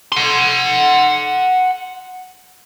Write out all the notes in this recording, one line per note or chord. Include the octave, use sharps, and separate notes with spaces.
F#5 C6